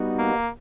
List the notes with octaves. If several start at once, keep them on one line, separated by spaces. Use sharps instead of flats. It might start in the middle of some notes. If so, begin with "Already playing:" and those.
Already playing: G3 B3 D#4 F#4
A#3